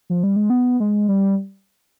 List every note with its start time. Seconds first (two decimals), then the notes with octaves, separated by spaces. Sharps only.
0.10 F3
0.23 G3
0.36 G#3
0.50 B3
0.80 G#3
1.09 G3